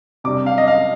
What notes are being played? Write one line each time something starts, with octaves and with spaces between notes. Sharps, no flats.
C3 G3 D4 D6
F5
D#5
F5